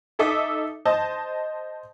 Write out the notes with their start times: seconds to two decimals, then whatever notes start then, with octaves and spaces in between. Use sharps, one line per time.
0.19 D#4 A4 E5 D6 D#6
0.85 C5 D#5 A5